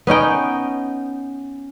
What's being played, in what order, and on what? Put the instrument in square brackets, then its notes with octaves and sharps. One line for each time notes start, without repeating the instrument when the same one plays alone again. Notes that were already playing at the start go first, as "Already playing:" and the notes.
[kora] B3 C#4 D#4 G5